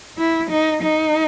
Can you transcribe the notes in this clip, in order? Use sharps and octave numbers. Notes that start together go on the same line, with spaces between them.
E4
D#4
D#4